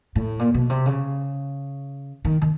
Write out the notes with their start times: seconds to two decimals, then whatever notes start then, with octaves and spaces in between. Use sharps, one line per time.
0.16 A2
0.39 A#2
0.54 B2
0.70 C3
0.86 C#3
2.25 D#3
2.42 D#3